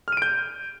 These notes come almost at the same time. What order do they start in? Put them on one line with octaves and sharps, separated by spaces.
F6 D#7 D7 G6